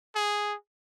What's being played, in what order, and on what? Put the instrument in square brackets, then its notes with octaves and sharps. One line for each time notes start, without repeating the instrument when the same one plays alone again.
[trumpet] G#4